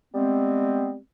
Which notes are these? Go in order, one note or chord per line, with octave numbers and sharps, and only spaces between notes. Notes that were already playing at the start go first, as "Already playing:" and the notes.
G3 G#3 B3 C4